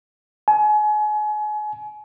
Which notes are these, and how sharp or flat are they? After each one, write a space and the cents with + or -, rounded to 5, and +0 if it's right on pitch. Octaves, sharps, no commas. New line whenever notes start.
G#5 +35